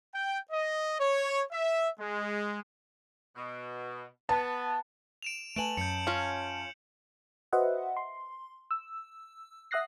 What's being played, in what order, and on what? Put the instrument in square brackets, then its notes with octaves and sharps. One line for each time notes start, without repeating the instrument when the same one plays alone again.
[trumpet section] G5
D#5
C#5
E5
G#3
[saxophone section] B2
[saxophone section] B3 [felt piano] A5
[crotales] D7 E7 F7
[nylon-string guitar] A3 B4 G#5 [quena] A5 [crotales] D7 E7 F#7
[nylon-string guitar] F#2 [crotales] G6 C#7
[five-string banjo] C#4 F4
[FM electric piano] F#4 B4 C5 D#5 E5 F#5
C6
E6
E5 F#5 D#6 F#6 A#6 C7